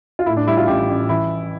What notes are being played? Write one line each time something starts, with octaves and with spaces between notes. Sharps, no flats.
F4
A2 E4
D4
G3 E4
F4
A1 G4
A1
E3 E4